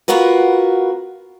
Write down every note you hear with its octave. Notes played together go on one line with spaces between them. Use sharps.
B3 F4 F#4 A#4 B4